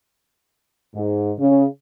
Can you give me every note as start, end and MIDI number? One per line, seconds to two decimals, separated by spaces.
0.95 1.32 44
1.39 1.66 49